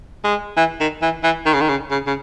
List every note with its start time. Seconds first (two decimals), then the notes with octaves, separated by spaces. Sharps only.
0.24 G#3
0.57 E3
0.80 D#3
1.02 E3
1.24 E3
1.46 D#3
1.54 C#3
1.61 D#3
1.69 C#3
1.91 C#3
2.07 C#3